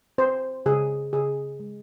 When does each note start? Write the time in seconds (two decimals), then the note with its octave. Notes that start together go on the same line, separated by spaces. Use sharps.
0.18 C4 C5
0.66 C#3 G#4
1.13 C#3 G#4
1.60 G#3